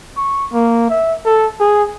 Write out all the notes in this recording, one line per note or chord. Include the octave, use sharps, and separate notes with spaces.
C#6
A#3
E5
A4
G#4